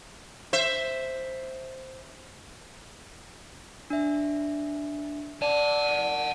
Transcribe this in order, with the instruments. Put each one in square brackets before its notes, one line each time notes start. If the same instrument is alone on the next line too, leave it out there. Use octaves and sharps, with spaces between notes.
[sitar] C5 E5
[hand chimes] D4 E5
[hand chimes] D5 [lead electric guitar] F#5 A5